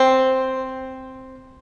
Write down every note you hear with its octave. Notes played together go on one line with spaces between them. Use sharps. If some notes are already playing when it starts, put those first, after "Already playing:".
Already playing: C4